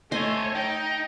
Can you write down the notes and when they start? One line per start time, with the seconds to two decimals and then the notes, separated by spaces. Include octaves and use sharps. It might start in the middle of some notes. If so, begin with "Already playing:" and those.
0.12 A3 C5 C#5 D#5 G#5
0.55 D#4 G5